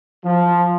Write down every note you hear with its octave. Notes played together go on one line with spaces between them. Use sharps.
F3